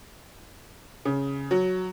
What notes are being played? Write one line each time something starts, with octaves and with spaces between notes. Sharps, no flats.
C#3
F#3